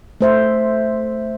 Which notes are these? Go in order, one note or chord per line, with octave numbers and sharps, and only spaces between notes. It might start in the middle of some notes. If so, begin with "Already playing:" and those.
A3 C5 E5